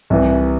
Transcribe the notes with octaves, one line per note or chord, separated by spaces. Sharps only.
C2 C3 E3